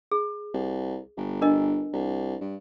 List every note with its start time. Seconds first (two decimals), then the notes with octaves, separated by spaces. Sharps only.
0.12 G#4
0.54 C2
1.17 G1
1.42 D4 A#4 D#5
1.93 C2
2.41 G2